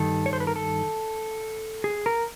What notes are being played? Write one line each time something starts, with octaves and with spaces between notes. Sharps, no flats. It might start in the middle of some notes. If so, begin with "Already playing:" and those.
Already playing: G2 D#3 A4
C#5
C5
B4
A#4
A4
G#4
A#4